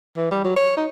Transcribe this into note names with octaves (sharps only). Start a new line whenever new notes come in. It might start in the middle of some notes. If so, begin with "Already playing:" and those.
E3
G3
F#3
C#5
D#4